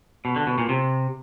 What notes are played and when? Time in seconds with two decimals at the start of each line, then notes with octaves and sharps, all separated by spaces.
0.25 B2
0.36 D3
0.47 B2
0.58 A#2
0.69 C3